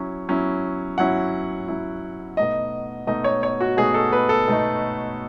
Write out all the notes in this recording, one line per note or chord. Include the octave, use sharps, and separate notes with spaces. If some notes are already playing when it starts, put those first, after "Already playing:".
Already playing: F#3 C#4 E4
F#3 C#4 E4
F#3 C#4 E4 F#5
F#3 C#4 E4
B2 A3 D#4 D#5
B2 A3 D#4 D#5
C#5
C#5
F#4
B2 A3 D#4 G#4
A4
B4
A4
B2 A3 D#4